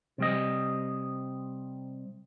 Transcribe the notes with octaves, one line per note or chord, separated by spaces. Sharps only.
C3 G3 D#5